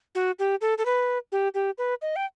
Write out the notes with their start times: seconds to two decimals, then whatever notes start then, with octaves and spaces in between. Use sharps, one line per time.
0.15 F#4
0.39 G4
0.61 A4
0.78 A4
0.85 B4
1.32 G4
1.54 G4
1.78 B4
2.02 D#5
2.16 G5